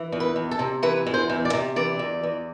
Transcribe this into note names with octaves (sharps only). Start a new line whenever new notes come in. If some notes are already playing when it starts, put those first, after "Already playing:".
Already playing: E3
E2
B4
E2
A4
C3
E3 B4
E2
C5
E2
D5
C3
E3 D5
E2
E2